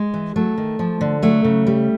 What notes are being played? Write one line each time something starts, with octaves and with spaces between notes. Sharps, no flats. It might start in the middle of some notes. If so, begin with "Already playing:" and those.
Already playing: G#3
E3
F#3 A3
D#3
F3
D3
F#3 A3
C#3
G3